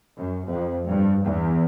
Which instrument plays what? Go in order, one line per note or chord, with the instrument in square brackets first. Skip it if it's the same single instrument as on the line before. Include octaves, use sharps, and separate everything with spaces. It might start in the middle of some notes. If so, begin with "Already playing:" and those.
[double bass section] F#2
F2
G2
E2